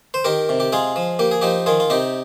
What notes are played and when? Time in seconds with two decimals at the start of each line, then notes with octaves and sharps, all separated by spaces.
0.14 C5
0.24 D#3 G4 A#4
0.49 C3
0.60 G4
0.73 G#3 F4 G#4
0.96 F3
1.19 A#3 G4
1.31 G#4
1.42 F3 D#4 G4
1.66 D#3 F4 G#4
1.80 F4
1.90 C3 D#4 G4